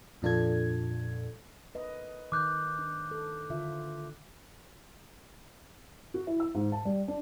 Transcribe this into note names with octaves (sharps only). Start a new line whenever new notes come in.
F2 A#2 D4 F4 A4 G#6
B4 D#5
D#3 D6 F#6 G6
D4
A4
D3 F4 E5
F#4
E4
E6
G#2
A5
G3
D4